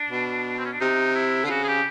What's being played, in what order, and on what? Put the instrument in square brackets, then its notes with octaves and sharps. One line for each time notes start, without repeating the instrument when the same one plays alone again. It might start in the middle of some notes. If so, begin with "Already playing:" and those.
Already playing: [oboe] D4
[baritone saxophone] B2
[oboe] C4
C#4
D4
[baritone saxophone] C3 [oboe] D#4
[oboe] E4
[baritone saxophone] D3 [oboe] F4
[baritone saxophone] C#3 [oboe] F#4
[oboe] G#4
G4